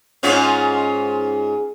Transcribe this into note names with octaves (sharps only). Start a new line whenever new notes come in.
G#2 C#4 F4